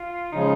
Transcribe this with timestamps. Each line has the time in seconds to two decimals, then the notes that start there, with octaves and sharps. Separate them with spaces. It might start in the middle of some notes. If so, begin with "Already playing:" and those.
Already playing: F4
0.32 C#3 F3 G#3 D#4